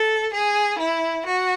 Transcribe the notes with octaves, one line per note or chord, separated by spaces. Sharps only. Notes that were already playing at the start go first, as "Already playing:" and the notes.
Already playing: A4
G#4
E4
F#4